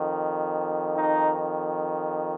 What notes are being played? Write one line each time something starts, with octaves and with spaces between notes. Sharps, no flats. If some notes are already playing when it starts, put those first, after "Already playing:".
Already playing: F2 D#3
D#4